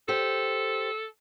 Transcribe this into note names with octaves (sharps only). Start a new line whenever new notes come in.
G4 A4 C5